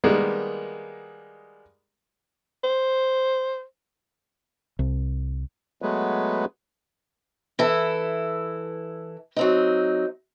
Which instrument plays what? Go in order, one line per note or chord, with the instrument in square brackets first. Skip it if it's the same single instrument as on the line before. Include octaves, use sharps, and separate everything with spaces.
[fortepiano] D#3 G3 G#3 A#3 B3
[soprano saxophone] C5
[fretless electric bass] C2
[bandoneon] F#3 G#3 A3 B3 B4
[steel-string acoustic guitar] E3 E4 A4
F#3 C4 D#4